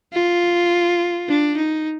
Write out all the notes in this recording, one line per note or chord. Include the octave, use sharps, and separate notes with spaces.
F4
D4
D#4